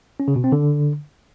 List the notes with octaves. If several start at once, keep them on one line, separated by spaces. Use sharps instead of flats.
C#4
C#3
B2
C4
D3